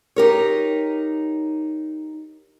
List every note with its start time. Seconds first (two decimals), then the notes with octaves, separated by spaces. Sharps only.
0.16 D#4 G4 A#4 C#5